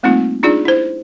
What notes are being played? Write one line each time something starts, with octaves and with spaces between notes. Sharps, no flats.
G3 A3 A#3 C4 D#4 F4
D4 D#4 F4 G#4 D5
E4 C5